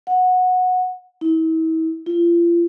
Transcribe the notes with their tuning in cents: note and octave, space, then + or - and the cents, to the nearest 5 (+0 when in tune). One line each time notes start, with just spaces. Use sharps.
F#5 -15
E4 -40
F4 -40